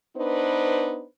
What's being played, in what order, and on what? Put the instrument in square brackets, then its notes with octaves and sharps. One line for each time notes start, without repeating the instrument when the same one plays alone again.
[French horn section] B3 D4 D#4 B4 C5